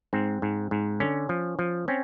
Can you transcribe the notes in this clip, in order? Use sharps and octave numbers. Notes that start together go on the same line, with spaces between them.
G#2 C4
G#2
G#2
D3 C#4
F3
F3
C4 C#4